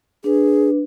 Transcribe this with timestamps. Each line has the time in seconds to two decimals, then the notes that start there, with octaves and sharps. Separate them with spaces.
0.24 D4 G#4 B4